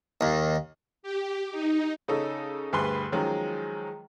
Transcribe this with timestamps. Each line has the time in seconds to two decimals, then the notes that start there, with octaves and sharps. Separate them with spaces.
0.21 D#2
1.03 G4
1.52 D#4
2.08 C#3 C#4 D#4 A4
2.73 D2 G2 G#4 B4 C6
3.12 D#3 F3 F#3 G#3 C#4